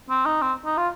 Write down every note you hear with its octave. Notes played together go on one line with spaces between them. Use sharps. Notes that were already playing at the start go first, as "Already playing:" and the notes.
C4
D#4
C4
D#4
F4